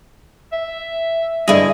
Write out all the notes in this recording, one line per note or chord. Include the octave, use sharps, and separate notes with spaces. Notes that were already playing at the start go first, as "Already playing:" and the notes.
E5
G2 D3 E4 G#4 D#5